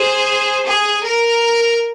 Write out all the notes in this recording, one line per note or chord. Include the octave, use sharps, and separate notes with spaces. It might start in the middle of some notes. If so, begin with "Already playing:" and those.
Already playing: G#4 C5
G#4
A#4